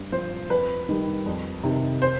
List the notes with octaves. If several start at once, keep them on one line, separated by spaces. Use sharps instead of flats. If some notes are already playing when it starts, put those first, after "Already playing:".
Already playing: G2
F3 C5
F2 B4
D#3 G3
F2
C3 D#3
C5